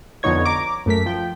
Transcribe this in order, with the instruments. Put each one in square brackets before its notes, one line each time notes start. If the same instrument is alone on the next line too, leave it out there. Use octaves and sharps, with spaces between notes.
[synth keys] F2 D3 B3 D#4 C#5 G#6
A#5 D6
F#2 A3 A#4 B6
F3 G5